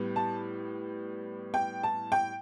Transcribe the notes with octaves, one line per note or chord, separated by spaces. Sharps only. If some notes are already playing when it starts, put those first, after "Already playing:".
Already playing: A2 G3 B3
A5
G5
A5
G5